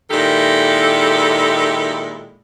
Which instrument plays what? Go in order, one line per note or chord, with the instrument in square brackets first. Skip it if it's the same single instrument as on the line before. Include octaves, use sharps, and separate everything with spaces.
[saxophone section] A#2 D#3 G#3 E4 G4 A4